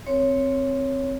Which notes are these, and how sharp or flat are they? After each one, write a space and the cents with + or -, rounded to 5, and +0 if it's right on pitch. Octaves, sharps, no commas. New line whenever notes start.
C4 +0 A#4 +0 C#5 +0